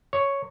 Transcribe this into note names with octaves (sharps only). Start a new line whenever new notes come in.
C#5